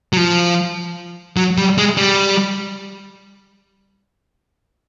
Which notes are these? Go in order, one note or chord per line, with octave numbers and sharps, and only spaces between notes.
F#3
F3
F#3
G3
G#3
G3